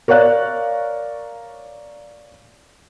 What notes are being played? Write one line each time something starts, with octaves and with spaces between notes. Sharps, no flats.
A#4 C#5 D5 F5 F#6